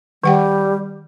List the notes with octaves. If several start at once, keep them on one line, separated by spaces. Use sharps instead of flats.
D#3 G3 F#5 G5